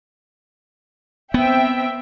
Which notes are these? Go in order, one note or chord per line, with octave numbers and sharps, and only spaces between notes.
B3 C4 E5 G5